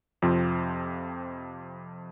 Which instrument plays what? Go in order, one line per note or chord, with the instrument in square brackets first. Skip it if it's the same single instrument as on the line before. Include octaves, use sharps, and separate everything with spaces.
[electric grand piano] F2 C3 F3 C4 F4